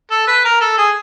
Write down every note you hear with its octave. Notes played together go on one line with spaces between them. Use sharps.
A4
B4
A#4
A4
G#4